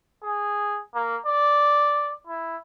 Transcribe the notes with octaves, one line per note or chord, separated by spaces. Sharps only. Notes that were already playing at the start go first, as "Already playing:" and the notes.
G#4
A#3
D5
E4